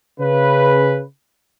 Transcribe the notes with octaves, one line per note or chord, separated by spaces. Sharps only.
C#3 B4